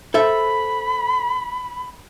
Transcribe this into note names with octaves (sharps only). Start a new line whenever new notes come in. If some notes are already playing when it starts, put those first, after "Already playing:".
A4 C5 E5 B5